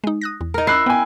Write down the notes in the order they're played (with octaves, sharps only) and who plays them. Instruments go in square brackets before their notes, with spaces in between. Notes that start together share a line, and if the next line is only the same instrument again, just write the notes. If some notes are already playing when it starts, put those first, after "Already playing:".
[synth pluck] G#3 D#4
D#6 F#6 A#6
E2
[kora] D#4 A#4
[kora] E4 [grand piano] E6 F#6 C7
[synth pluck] B3 B5 [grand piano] G5 G#5